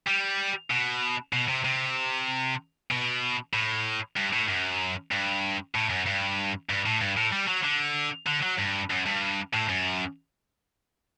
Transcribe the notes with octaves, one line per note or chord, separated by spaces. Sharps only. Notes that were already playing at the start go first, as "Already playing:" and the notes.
G3
B2
B2
C3
C3
B2
A2
G2
A2
F#2
G2
A2
F#2
G2
G2
A2
G2
A2
G3
F#3
D3
D3
F#3
G2
F#2
G2
A2
F#2